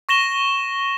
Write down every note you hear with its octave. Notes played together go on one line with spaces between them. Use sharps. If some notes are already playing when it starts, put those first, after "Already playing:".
C#6 A#6 E7 G7